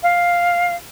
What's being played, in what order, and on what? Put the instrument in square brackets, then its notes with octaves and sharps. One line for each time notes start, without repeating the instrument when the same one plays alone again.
[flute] F5